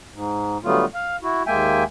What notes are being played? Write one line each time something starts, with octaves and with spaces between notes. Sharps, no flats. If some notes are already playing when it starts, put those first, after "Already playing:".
G#2
D3 F#3 G3 A3 B3 F4
F5
E4 F#4
D#2 G#3 A#3 E5 G5 G#5